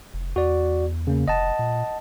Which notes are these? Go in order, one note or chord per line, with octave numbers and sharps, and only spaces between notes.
F1
E2 F#4 D5
C#3 A#3
F1 D#5 F#5 A5
A#2